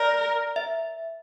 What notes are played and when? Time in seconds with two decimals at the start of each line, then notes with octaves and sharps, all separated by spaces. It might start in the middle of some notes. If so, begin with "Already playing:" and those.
Already playing: A#4 D5
0.56 E5